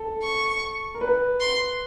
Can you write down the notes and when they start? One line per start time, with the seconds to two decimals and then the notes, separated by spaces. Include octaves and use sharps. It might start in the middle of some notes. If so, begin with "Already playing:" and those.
Already playing: A4
0.23 C#6
0.95 A#4
1.01 B4
1.40 C6